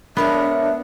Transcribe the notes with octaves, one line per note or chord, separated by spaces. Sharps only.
G#3 B3 D4 A#4 C#5 E5